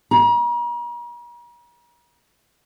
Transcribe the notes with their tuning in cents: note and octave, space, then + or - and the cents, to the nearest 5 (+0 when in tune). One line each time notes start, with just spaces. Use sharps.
A#5 +45